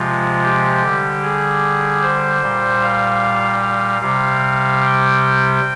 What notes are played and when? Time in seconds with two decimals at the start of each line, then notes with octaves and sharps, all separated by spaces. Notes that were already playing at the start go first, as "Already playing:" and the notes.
Already playing: C3 F3 G#3 F4
0.43 G4
0.83 D3 G3
1.22 G#4
2.02 C5
2.42 A#2 G3
2.82 F5
3.62 F5
4.01 C3 G3 F5
4.81 G5